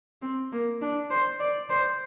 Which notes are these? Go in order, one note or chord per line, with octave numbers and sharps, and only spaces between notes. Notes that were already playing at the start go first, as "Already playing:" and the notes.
C4
A#3
D4
C5
D5
C5